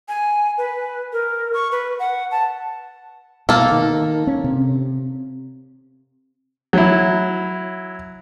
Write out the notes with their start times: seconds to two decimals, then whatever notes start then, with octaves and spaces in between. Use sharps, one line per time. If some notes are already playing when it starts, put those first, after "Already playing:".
0.08 G#5
0.58 B4
1.13 A#4
1.54 C#6
1.72 B4
1.99 F#5
2.31 A5
3.49 B2 A#3 A4
3.71 D#3
4.27 C#4
4.44 C3
6.73 F#3 E4